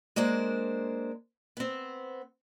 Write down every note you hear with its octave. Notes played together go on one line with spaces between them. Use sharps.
G#3 A#3 D4 C5
B3 C4